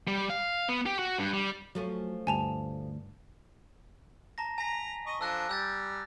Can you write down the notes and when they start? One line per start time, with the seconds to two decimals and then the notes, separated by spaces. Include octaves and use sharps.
0.08 G3
0.30 F5
0.69 B3
0.86 G4
0.99 F#4
1.18 G2
1.34 G3
1.75 F3 F#3 A3 C#4
2.27 D2 G2 G#5 A5 F7
4.38 A5 A#5 A#6
4.58 G#5 A#5 B6
5.06 D#5 C#6
5.21 F3 D4 A4 E6 F#6 A#6
5.49 G3 E6 G6 A6